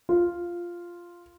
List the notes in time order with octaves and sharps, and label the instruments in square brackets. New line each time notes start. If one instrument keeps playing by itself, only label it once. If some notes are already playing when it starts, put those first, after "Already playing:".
[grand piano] F4